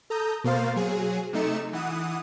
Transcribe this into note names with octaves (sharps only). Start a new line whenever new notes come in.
A4 A#5 D#6 G6
B2 A#3 C5 F5 A6
F#3 G#4
C3 A3 D#4 C#7 E7
E3 F#5 D#6